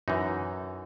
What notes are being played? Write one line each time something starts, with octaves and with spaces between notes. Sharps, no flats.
F#2 E3 D#4